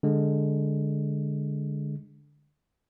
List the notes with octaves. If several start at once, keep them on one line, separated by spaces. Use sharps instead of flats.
D3 G#3